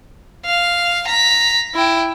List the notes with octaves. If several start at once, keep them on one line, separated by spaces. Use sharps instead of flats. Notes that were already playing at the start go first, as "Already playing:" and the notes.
F5
A#5 B6
E4 G5